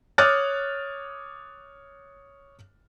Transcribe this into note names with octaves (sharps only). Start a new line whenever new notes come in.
C#5 D6 D#6 F6 F#6 A6